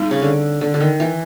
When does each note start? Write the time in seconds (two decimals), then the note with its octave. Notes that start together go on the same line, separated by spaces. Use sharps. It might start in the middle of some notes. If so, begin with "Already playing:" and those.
Already playing: G3 C4 D#4 G#4
0.11 C#3
0.22 D3
0.61 D3
0.74 D3
0.80 D#3
1.00 E3